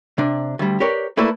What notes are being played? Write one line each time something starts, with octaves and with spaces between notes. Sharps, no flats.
C3 D4
D2 G3
G4 A#4 B4 C#5 D5
A3 A#3 E4 A4 B4 D5